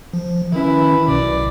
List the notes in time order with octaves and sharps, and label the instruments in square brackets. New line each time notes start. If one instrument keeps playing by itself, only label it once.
[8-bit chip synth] F3
[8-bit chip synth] D#3 C#4 [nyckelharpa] E4 B4
[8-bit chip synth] B1 B2 [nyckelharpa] D5